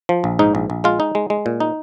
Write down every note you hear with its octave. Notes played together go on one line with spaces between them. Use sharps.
F3
A#1
G#2 D#4
A#1
A#1
G#3 F4
D#4
G#3
G#3
A#2
D#4